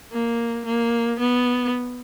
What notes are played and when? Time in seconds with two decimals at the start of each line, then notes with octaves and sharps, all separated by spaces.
0.12 A#3
0.66 A#3
1.20 B3